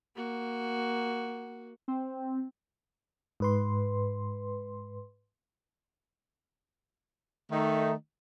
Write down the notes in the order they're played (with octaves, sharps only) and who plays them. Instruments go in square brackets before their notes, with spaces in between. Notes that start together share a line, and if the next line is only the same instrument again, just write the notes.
[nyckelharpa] A#3 F#4
[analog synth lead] C4
[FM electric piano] G#2 B4 C6
[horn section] D#3 A3 D#4